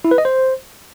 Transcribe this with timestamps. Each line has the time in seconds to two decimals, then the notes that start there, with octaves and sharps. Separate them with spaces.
0.05 E4
0.11 B4
0.18 D#5
0.25 C5